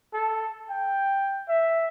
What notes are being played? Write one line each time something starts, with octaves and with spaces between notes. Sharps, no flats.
A4
G5
E5